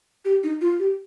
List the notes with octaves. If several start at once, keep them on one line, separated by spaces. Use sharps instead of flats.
G4
D#4
F4
G4